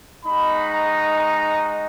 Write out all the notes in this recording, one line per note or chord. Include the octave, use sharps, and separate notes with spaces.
G#3 D#4 F#4 B5
A#5
A#5